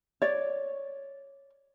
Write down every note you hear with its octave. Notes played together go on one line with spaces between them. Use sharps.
C#5 D5